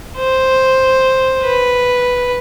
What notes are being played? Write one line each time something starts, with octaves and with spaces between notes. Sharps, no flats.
C5
B4